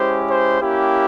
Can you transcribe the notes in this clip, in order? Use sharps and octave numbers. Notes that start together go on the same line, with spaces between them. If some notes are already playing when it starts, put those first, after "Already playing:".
Already playing: G#3 C#4 E4 G4 C5
C5
A#3 C#4 E4 G4